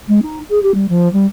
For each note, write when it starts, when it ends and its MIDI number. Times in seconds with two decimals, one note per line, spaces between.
0.08 0.20 56
0.22 0.39 63
0.50 0.62 68
0.63 0.74 67
0.74 0.86 55
0.89 1.11 53
1.13 1.26 55